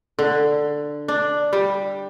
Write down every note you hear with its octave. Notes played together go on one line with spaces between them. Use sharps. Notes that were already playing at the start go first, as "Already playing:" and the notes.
D3
D4
G3